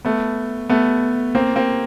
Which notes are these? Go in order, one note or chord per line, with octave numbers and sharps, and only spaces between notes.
A3 B3
A3 B3
A#3 C4
A#3 C4